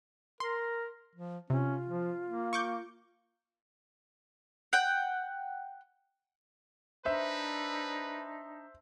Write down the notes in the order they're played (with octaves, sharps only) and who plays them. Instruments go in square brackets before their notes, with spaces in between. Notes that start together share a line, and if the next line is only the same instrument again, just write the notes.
[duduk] A#4 [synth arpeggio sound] C6
[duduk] F3
[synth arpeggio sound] C3 [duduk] C#4 [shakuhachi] F4
[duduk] F3
A#3
[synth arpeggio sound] C#6 D6 G6
[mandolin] F#5 G5
[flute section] D4 D#4 [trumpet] B4 [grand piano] C5 E5